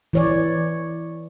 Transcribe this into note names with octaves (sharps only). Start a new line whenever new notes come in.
E3 C#5 D5